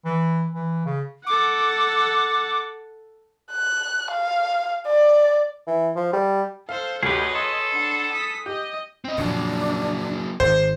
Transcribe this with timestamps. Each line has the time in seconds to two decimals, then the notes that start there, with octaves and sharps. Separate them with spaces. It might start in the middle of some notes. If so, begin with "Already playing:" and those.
0.05 E3
0.53 E3
0.86 C#3
1.26 A4 F#5 D6
3.52 F#6
4.11 F5
4.87 D5
5.67 E3
5.96 F3
6.13 G3
6.69 A4 C5 F5
7.03 D2 G4 G#4 B4 C#5 D#5
7.35 A4 C6
7.74 D4 F#5
8.13 D#6 B6
8.46 G4 D#5
9.05 C4 D#5
9.18 F2 A#2 F#3 A#3 D4
10.40 G#1 C5